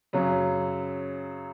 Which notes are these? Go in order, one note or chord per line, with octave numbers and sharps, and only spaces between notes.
F#2 C#3 F#3